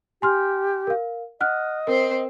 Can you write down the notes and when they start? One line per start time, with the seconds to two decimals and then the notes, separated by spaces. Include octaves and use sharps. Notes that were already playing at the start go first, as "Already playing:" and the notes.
0.22 G4 G#5 C6 F6
0.87 A#4 F5
1.41 D#5 F#5 F6 F#6
1.87 C4 A#4 C5